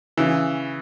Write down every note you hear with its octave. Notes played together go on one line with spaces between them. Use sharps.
C#3 E3